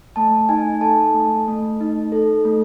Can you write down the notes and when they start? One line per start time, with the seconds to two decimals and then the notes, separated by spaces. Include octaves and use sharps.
0.16 A3 A5
0.49 D#4 G#5
0.81 A4 A5
1.14 A3
1.48 A3
1.81 D#4
2.12 A4
2.45 A3